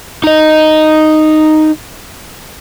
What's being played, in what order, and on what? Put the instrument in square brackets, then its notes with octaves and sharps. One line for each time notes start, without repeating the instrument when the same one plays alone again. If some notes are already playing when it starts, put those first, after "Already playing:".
[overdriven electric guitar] D#4 D#5